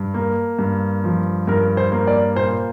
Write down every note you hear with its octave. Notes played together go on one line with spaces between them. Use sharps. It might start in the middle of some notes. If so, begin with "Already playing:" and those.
Already playing: G2
A#3
G2
F3
G2 A#4
C5
A#3
D5
A#2 C5